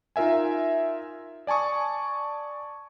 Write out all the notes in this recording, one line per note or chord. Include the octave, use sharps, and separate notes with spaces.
D#4 F4 A#4 E5 G#5
D5 G#5 A5 C#6 D#6